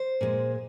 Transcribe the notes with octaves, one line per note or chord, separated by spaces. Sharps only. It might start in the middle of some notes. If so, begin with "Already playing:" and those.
Already playing: C5
A#2 G#3